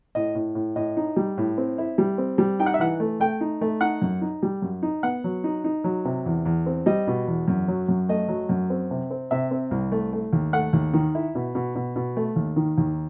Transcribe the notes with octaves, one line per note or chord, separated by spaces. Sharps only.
A2 D#5
A2
A2
A2 D#5
D#4
G3
A2
C4
E4
G3
C4
G3
D#4 G5
F#5
E5
E3 F#5
A3
A3 G5
D#4
A3
D#4 F#5
F#2
D#4
G3
F#2
D#4
B3 F#5
F#3
D#4
D#4
F#3
C3
E2
E2
C4
G3 D#5
B2
E2
F#2
F#3
F#2
A3 D#5
F#3
F#2
C4
C3
C4
C3 E5
C4
C2
A3
A3
D#2
A3 F#5
D#2
D#3
E4
B2
B2
B2
B2
A3
D#2
D#3
D#2